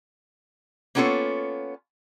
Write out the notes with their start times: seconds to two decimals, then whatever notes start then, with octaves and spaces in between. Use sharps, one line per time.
0.95 A#3 B3 C#4 F4 A4 C#5